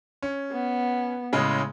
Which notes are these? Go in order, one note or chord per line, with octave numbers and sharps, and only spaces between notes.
C#4
B3
A2 C#3 G#3